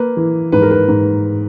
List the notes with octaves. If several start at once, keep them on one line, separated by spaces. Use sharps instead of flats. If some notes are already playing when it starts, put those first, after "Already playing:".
Already playing: A#3 B4
E3
G#2 B4
A#4
B4
G#2